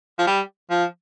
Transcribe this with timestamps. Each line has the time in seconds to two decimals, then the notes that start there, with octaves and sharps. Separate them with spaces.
0.19 F3
0.27 G3
0.70 F3